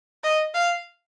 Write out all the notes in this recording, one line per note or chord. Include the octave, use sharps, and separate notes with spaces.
D#5
F5